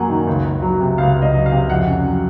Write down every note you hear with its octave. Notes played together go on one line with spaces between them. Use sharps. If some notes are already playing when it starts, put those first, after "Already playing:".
Already playing: F#2 F#3 A#3 F#5 G#5
D#3
C#2
C#2
F#3
C3
C#2 F5
C#2
D#5
F#3
F5
C3
F2 F#5
C#4
F#3